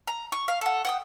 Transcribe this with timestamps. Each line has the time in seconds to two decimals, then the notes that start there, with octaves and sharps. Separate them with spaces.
0.07 A#5
0.32 C#6
0.48 F5
0.61 A4 F#5
0.85 F#5 G5 D#6